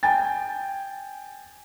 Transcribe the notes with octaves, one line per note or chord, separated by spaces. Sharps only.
G5 G#5 A6